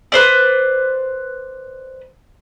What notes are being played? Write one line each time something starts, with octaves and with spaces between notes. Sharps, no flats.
B4 C5 D5